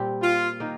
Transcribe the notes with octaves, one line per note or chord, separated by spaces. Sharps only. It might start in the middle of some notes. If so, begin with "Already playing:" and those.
Already playing: A#2 G3 C4 G4
F4
D#3 A#3 D#4